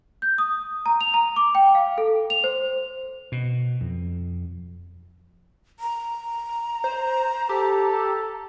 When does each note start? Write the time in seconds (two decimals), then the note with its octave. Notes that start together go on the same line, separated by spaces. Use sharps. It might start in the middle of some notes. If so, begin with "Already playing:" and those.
0.22 G6
0.38 D#6
0.86 A#5
1.01 F7
1.14 A#5
1.36 D6
1.55 G5
1.75 F5
1.98 A4
2.30 F7
2.44 C5
3.32 B2
3.81 F2
5.80 A#5
6.84 C5
7.49 G4 A4